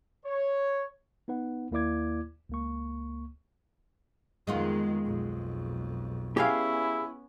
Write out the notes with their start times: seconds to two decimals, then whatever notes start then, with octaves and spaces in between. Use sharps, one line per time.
0.25 C#5
1.28 B3 D#4 B4 F#5
1.71 D#2 A#3 E4 D5 D6 G#6
2.49 C#2 A#3 C#6
4.47 F2 D#3 G#3 B3 F4
5.04 B1 F2
6.37 B3 C#4 E4 G4 G#4 F5